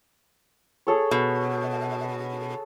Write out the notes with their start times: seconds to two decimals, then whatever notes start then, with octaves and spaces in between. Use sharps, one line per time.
0.87 G#4 A4 C#5
1.11 B2